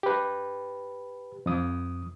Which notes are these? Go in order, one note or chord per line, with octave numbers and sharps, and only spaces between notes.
G4 B4
F2 D#6